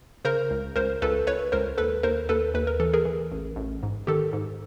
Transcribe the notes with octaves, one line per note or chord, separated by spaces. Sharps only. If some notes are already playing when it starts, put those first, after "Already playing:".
C#3 A#4 C5
C#2
C#2 A#4 C5
C#2 A4 B4
C#2 B4 C#5
C#2 A#4 C5
D#2 A4 B4
D#2 A#4 C5
D#2 A4 B4
D#2 B4
A#4
E3 A4
G#4 A#4
E3
A1
A1
G#2
D#3 G4 A4
G#2